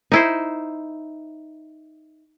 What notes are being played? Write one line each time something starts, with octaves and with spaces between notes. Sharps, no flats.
D#4 E4 C5